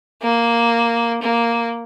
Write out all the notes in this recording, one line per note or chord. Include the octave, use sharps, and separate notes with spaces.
A#3
A#3